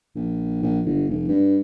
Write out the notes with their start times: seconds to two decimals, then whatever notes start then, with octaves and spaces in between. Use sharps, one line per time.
0.15 A#1
0.62 A#1
0.85 G1
1.09 F1
1.28 G2